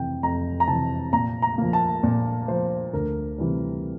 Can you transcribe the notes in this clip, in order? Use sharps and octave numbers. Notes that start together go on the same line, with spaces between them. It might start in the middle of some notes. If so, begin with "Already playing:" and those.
Already playing: F2 C3 E3 G5
F2 A#5
A#5
C3 E3 A5
A#2 A#5
A#5
F3 A#3
A5
A#2
F3 A#3 C5
D2 A#4
C3 E3 G3